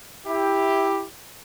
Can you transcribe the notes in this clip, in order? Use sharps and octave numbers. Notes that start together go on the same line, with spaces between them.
E4 G4